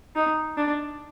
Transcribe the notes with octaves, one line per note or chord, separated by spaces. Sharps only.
D#4
D4